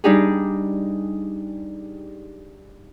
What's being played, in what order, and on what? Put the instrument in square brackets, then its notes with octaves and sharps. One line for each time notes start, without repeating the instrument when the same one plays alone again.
[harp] G3 D4 D#4 G4 G#4